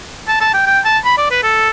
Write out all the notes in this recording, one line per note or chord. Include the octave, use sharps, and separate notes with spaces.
A5
A5
G5
G5
A5
B5
D5
B4
A4